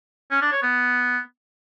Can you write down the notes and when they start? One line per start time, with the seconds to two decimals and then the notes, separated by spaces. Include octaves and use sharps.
0.31 C#4
0.42 D4
0.52 C#5
0.63 B3